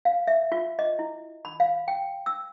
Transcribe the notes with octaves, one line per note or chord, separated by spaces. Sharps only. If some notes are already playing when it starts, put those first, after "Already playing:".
F5
E5
F4
D#5
E4
B5
F5
G5
E6